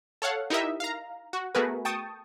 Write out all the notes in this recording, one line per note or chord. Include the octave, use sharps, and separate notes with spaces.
A4 C#5 F5 F#5
D#4 E4 G4 A#4 D#5 E5
F5 A#5
F#4
A3 B3 F#4 G#4 A#4 B4
G5 A5 C#6 D#6